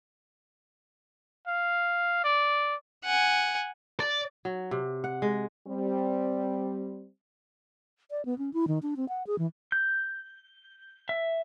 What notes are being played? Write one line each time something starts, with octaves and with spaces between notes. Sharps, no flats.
F5
D5
F#5 G#5
D5
F#3
C3
F#5
G#3
G3 C4
D5
B3
C#4
E4
D#3
D4
C4
F#5
G#4
E3
G6
E5